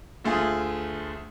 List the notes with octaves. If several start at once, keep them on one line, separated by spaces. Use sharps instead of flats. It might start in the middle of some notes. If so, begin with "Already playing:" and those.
D2 A3 F4 G#4